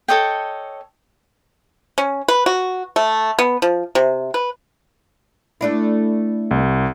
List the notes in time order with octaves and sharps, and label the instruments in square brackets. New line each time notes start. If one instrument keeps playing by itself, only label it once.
[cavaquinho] A4 C#5 D#5 G5
[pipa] C#4
B4
F#4
A3
B3
F3
C3
B4
[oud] A3 D4 E4
[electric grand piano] C2